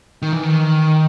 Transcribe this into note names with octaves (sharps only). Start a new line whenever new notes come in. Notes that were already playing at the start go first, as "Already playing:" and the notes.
D#3
E3
D#3